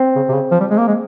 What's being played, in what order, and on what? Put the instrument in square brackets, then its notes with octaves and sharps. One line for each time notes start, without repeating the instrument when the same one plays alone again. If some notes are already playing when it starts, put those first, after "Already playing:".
Already playing: [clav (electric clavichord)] C4
[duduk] C#3
C3
C#3
F3
G3
G#3
A#3
G#3